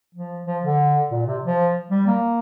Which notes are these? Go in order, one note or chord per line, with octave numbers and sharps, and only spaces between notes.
F3
F3
D3
A#2
C3
F3
G3
A#3